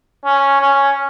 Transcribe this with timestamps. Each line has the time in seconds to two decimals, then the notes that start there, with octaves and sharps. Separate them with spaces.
0.25 C#4
0.61 C#4